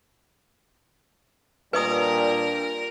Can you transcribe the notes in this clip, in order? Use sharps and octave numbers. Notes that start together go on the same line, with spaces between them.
A#2 G3 D4 A#4 B4 D#5 D#6